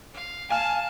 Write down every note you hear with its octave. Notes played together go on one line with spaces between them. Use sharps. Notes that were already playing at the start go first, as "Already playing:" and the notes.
F5
F5 G#5 A5 F6